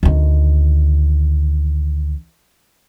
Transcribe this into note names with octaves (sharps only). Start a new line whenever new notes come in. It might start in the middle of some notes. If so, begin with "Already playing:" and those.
D2 D#3